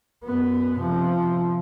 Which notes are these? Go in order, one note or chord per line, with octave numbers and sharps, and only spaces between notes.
F#2 B3
C3 F3